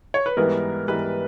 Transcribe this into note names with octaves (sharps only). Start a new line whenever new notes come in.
C#5
B4
G#2 E3 G3 B3 A#4
G#2 E3 G3 B3 B4